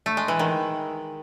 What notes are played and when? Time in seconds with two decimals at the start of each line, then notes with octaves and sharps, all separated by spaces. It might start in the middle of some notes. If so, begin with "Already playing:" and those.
0.06 A3
0.17 G#3
0.28 E3
0.39 D#3